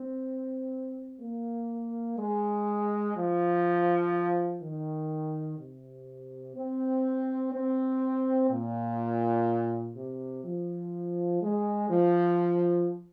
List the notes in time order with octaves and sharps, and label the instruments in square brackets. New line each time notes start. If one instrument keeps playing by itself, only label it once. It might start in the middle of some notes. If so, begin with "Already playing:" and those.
Already playing: [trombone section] C4
A#3
G#3
F3
D#3
C3
C4
C4
A#2
C3
F3
G#3
F3